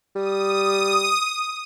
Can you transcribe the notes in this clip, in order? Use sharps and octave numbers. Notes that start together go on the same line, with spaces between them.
G3 D#6